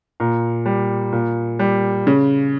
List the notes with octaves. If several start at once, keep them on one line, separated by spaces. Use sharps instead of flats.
A#2 A#5
G3
A#2
G3
C#3